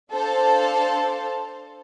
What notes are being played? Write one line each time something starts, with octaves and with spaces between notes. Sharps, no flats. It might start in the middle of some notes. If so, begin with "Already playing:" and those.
D4 A4 C5 F5 A5